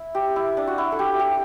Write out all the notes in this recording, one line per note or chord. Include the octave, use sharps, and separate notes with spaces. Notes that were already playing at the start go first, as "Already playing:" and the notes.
Already playing: E4
G4
E4
D4
F#4
E4
A4
G4
G4